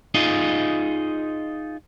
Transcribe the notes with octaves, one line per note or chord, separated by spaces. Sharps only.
D#4 F4 G#4 D#5